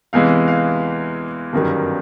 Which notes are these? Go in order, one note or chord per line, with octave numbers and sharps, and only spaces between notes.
E2 C3 E3 G#3 F5
F5
G1 F#2 D#3 G3